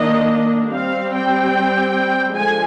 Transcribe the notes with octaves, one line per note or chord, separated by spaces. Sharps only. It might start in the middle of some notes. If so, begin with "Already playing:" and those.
Already playing: D#3 A#3 D4 D#5
G3 C4 F5
G5
D3 F3 G#3 G#5